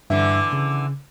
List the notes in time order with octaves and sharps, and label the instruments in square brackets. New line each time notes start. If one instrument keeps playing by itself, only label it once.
[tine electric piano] G2 E5 [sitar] D3 E3
[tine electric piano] C#3